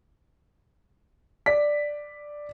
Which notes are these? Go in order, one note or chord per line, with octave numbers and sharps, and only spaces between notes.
D5 B6